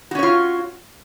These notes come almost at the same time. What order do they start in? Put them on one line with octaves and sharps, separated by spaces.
F#4 C#4 C#5 F4